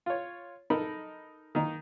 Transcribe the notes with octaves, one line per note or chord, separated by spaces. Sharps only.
F4 C#5
D#4 A4 A#4 D#5 B5
D#3 A#3 D#4